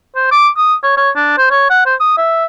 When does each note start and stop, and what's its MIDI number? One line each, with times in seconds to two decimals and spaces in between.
0.16 0.31 72
0.32 0.49 86
0.57 0.75 87
0.83 0.94 73
0.97 1.10 73
1.16 1.34 62
1.38 1.47 72
1.51 1.65 73
1.70 1.84 78
1.86 1.95 72
2.00 2.17 87
2.18 2.45 76